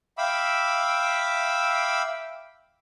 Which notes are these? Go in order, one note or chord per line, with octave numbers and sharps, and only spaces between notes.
E5 F5 G5 B5 D6 E6